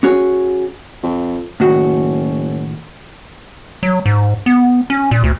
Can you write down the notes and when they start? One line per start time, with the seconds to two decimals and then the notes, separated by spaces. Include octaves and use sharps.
0.03 C#4 F#4 G#4 C#5
1.03 F2
1.60 F#1 A2 D#3 F#4
3.83 F#3
4.06 G#2
4.46 B3
4.90 C#4
5.11 A#2
5.24 D2